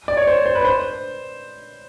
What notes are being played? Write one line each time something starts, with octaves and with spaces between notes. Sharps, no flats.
D5
C#5
C5
C5
B4
C5